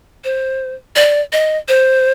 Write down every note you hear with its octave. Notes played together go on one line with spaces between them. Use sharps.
C5
D5
D#5
C5